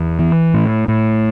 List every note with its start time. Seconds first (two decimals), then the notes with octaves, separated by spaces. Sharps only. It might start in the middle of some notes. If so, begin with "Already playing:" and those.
Already playing: E2
0.19 E3
0.54 A2
0.88 A2